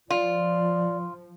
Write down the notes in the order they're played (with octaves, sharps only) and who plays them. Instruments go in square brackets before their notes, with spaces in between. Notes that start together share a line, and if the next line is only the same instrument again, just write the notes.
[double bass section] F3 [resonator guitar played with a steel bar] F4 [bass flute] D5